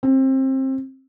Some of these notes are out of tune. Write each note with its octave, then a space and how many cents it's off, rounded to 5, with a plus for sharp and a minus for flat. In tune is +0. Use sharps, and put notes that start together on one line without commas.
C4 +25